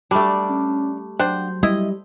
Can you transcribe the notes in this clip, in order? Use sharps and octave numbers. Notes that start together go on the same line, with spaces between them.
G3 A3 D4
C#4
F#3 D4 C5 F#5 G5
G3 E4 D#5